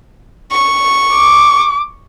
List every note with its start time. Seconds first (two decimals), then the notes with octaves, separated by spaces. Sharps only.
0.52 C#6
1.14 D6